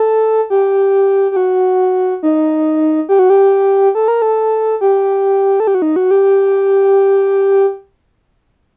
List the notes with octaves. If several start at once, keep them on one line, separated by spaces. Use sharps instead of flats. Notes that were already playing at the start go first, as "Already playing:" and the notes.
Already playing: A4
G4
G4
F#4
D#4
G4
F#4
G4
A4
A#4
A4
G4
A4
G4
F#4
D#4
F#4
G4